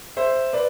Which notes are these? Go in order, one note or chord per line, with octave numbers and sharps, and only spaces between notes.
C5 E5
B4 D5